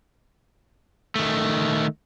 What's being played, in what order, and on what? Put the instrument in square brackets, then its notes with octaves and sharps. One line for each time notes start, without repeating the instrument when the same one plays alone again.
[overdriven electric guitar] D#3 A3